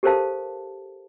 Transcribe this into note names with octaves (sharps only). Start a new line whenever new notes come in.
G4 A4 A#4 C5 F5 A5